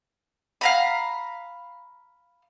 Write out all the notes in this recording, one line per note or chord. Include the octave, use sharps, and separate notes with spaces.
F5 A#5 B5